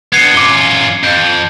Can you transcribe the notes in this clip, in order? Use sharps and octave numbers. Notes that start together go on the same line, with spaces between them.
B3 D4 G#6 C7 C#7
F#2 F4 D6 G7
F2 G6